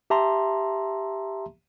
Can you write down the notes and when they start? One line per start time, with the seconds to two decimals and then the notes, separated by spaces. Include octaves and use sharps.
0.10 G4 E5 A5 A#5 C6